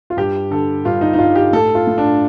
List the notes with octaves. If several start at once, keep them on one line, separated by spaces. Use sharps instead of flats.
F4
G2 G4
D3 A4
G2 F4
D#4
D#4
G2 F4
G4
A2 A4
F4
A2
D4